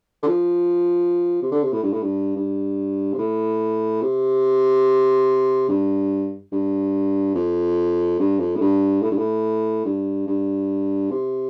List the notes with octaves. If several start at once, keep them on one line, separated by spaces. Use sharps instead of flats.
D3
F3
C3
D3
C3
A2
G2
A2
G2
G2
C3
A2
C3
G2
G2
F2
G2
F2
A2
G2
A2
G2
A2
G2
G2
C3